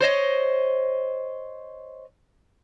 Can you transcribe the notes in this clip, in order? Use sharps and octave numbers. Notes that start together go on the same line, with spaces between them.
C5 C#5 D#5